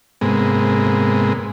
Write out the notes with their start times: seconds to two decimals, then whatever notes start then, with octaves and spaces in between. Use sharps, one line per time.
0.21 G#2 C3 G#3 A#3 B3